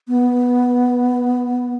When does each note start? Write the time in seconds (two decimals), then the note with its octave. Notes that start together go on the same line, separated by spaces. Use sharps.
0.08 B3